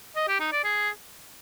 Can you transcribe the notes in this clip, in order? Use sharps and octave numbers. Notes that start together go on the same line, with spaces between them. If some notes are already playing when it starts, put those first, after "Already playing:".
D#5
G4
D#4
D5
G#4